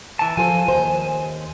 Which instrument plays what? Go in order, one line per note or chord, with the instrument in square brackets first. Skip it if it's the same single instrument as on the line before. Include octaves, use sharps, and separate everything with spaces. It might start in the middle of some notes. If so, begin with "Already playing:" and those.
[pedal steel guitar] E3 A5
[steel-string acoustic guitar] F3 A4 C5 [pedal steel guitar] G#5
[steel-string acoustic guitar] D#2 C5